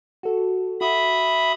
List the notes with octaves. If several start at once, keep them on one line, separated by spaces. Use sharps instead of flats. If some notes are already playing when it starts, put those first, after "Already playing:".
F#4 A4
F#4 E5 B5 D#6